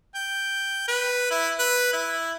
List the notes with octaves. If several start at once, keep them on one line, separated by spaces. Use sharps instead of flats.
G5
B4
E4
B4
E4